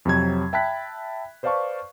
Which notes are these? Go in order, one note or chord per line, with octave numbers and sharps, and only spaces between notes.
F2 C3 F#3 G#6
E5 G5 A5 B5 F#6 B6
B4 C5 D5 F5 A5 C#6